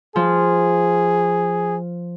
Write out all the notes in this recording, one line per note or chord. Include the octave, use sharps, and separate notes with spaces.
F3 G#4